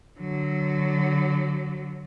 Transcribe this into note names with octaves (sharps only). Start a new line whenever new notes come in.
D3 F#3